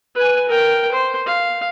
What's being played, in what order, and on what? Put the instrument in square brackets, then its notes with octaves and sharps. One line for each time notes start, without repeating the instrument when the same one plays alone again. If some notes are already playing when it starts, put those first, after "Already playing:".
[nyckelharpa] B4 G#5
A#4 G5
C5
F5